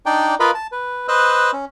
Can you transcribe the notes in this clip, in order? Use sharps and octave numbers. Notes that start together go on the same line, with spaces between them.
D4 D#4 D5 G5
F4 A#4 B4 D#5 F5 B5
A5
B4
B4 C5 D#5 E6 F#6
C#4